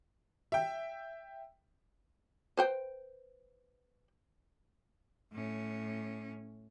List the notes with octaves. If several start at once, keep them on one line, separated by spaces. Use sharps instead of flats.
E5 G5
B4 C5 G5
A2 C#4